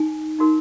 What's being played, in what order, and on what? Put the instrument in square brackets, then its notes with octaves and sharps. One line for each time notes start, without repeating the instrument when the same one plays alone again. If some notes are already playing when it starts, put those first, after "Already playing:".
Already playing: [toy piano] D#4 G#5
D#4 F#4 A#4